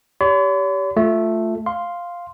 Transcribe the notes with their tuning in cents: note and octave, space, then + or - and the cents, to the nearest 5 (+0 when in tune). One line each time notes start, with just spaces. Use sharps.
G4 +0 C#5 +45 B5 +45
A3 +0 F4 +0
F5 +0 C6 +0